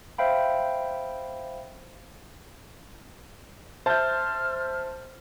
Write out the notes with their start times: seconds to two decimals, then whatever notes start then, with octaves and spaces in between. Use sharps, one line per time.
0.18 C5 E5 F5 G5 B5
3.86 C5 E5 A5 F6 G6